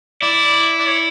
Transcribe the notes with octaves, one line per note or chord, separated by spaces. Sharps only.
E4 D5
D5
C#5